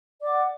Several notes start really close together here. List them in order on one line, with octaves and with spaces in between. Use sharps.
D5 D6 F#5